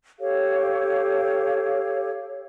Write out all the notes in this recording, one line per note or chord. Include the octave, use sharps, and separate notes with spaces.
G4 A4 C#5 F5